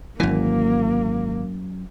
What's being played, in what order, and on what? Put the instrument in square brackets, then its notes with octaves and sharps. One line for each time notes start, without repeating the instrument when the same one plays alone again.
[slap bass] G#1 E3 [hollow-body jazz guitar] F#2 [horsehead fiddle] A#3